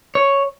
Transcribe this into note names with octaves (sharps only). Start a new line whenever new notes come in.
C#5